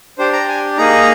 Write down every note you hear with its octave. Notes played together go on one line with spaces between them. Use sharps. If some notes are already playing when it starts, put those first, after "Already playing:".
D4 G4 C5
A#5
G#5
A#3 D#4 G#4 A#5